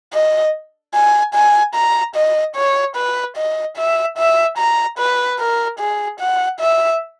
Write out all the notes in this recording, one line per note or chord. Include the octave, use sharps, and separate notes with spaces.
D#5
G#5
G#5
A#5
D#5
C#5
B4
D#5
E5
E5
A#5
B4
A#4
G#4
F#5
E5